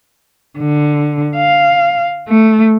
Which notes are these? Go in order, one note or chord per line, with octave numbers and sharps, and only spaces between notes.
D3
F5
A3